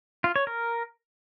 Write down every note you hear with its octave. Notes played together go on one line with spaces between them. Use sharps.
F4
C#5
A#4